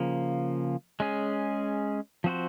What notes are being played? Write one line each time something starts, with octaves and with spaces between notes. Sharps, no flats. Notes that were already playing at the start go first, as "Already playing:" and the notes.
Already playing: C#3 F3 A#3
G#3 C#4 G#4
F3 C4 F#4 C5